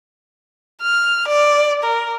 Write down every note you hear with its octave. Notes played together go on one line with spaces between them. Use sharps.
F6
D5
A#4